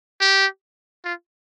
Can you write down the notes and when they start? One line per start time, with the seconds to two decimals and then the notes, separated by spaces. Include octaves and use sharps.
0.21 G4
1.04 F4